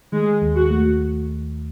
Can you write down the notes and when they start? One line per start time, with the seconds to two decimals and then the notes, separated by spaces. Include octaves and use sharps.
0.12 D#3 G#3
0.42 D#2
0.56 F#4
0.70 A3